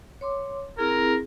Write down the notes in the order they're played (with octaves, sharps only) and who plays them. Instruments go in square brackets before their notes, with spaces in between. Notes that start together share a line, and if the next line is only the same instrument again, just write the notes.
[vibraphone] C#5 C6 D6
[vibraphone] C4 E4 G#4 [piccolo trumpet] A#4